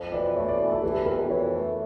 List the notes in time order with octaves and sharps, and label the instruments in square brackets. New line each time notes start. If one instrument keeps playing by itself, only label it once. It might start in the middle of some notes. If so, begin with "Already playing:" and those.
Already playing: [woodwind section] F2
[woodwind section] E3 [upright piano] D5
[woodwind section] A3 [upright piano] C#5
[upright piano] D5
[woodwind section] E3
[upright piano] A4
[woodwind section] E3 [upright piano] G4
[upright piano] A4
[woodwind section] F2 [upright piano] A#4
[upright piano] A#4
[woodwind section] E3 [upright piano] C#5
[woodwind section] A3